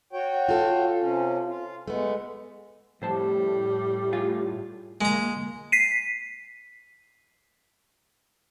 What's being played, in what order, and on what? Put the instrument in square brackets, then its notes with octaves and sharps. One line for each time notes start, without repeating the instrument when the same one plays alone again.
[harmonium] F#4 C#5 G5
[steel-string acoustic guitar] F4 A4
[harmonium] C3 C#4
F4
[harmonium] G#3 [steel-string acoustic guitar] A3 B3
[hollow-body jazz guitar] F2 C5 A5 [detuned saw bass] A2 [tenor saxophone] G3
[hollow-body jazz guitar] F4 G#4
[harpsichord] G#3 A#5 [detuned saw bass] A#3
[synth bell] B6 C7 D#7